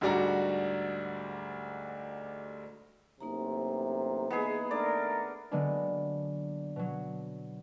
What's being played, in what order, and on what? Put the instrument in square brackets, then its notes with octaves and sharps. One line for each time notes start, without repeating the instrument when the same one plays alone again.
[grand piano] D2 G#2 G3 D4 F#4 A#5
[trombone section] A1 F#2 C3 [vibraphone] A#3 D#4 A#5
[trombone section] E3 G#3 [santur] B3 G#4
[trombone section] D#3 A3 D4 [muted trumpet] A#4 [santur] D5
[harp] D3 F#3 G#3 A#3 B3 D4
B2 F#3